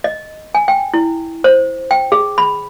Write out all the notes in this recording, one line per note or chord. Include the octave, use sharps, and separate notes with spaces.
D#5
G#5
G5
E4
C5
G5
G#4
B5